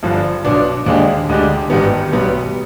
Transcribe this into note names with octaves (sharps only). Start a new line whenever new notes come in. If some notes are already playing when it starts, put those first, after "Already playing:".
G1 G2 D3 F3
B1 B2 B3 D4
D#2 D3 G#3 D4 G4
D2 D3 G#3 D4 G4
G#1 G2 D#3 G3 B3
B1 B2 G3 B3